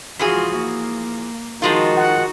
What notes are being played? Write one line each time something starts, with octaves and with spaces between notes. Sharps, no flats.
E3 F3 F4 F#4 G#4
A#3
D#3 F3 G#3 D#4 F4 F#4
F#5